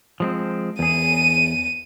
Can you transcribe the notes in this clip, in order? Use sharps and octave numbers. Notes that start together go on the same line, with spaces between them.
F3 G#3 C4
E2 G#4 D#7